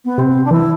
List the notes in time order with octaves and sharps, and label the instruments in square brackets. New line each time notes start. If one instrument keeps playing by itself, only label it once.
[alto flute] B3
[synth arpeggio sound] C3 [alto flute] C4
[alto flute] D4
[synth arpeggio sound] E3 [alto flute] E4